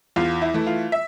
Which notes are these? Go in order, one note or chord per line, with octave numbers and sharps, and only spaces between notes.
E2 F4
E4
E3 A3
F4
E5